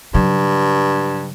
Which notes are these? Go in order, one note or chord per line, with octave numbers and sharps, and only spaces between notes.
G2 C#3 F#3